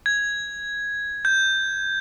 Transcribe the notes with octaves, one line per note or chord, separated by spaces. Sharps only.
G#6
G6